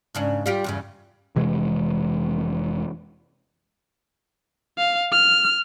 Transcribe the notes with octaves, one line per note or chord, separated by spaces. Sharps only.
G#2 C#3 D4
G3 F4 G4
E2 G2 C#3
F1 C3 E3 G#3
F5
F6